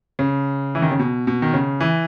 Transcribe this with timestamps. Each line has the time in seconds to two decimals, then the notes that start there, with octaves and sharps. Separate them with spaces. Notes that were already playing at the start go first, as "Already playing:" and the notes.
0.19 C#3
0.75 E3
0.82 D#3
0.91 C#3
0.99 B2
1.27 B2
1.42 D#3
1.53 C#3
1.80 E3